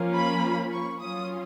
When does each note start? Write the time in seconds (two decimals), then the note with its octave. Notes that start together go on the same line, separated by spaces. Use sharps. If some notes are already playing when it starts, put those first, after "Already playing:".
Already playing: F3 A#3 C#4 F4
0.14 B5
0.71 C#6
1.00 F#3 C#4 F4 D#6